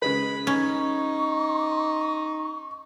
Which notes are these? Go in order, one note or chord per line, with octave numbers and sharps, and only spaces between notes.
C#3 G#3 B4 B5
C#4 D#4 C#6